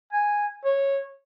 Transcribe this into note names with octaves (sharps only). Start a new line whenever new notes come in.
G#5
C#5